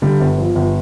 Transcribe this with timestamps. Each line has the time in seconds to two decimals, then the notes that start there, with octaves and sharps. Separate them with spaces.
0.02 D3 G3
0.20 G1
0.38 F3
0.55 G1